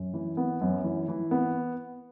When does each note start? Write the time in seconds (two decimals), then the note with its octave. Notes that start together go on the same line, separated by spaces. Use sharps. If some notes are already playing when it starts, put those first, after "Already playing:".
Already playing: F#2
0.14 E3
0.37 B3
0.61 F#2
0.84 E3
1.08 E3
1.31 B3